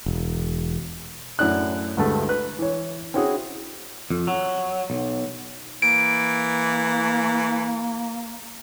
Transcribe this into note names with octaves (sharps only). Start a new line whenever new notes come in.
E1
F#2 A2 E4 D5 F#6
D2 G2 G#3 A3
B4 F#6
E3 C#5
C4 C#4 E4 F#4 G#4
F2
F#3
B1
E3 A#3 D7